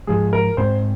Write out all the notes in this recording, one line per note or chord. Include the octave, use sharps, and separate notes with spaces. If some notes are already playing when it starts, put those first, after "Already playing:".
G#2 F3 G#3 G#4
A#4
G#2 G#3 C4 C5